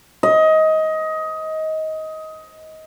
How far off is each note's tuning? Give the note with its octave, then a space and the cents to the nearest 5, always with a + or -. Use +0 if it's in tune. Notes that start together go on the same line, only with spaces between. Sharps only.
D#5 +20